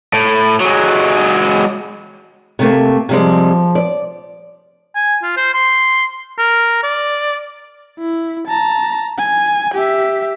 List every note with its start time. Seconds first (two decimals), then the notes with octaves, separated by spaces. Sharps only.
0.13 A2
0.60 F#3 G#3
2.59 C3 A3 A#3
3.09 C3 F3 G3 G#3
3.75 D5
4.96 G#5
5.23 F4
5.37 C5
5.54 C6
6.38 A#4
6.83 D5
7.99 E4
8.47 A5 A#5
9.18 G#5
9.74 G4 E5